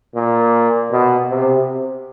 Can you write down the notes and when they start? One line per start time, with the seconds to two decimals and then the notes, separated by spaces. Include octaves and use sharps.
0.15 A#2
0.91 B2
1.30 C3